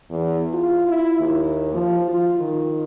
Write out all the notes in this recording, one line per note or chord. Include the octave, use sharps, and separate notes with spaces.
E2
F4
E4
D#2
F3
F4
D#3